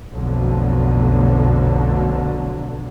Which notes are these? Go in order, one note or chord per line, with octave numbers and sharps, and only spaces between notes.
B1 F2 B2 D3 F#3 A3